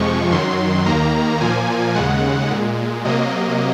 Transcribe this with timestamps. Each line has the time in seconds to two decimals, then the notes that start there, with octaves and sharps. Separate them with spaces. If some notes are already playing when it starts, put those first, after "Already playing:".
Already playing: F2 C3 F3 G#3 C#6
0.31 F#2 D#3 F#3 C6
0.86 D#2 D#3 A#3 A#5
1.41 A#2 F3 A#3 G#5
1.95 D#2 C#3 G#3 F#5
2.51 A#2 G#3
3.05 C3 F#3 A#3 D#5